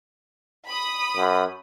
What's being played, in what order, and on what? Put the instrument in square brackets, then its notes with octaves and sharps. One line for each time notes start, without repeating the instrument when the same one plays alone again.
[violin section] B5 D#6
[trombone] F#2